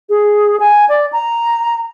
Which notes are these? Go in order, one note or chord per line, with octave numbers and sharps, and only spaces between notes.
G#4
G#5
D5
A#5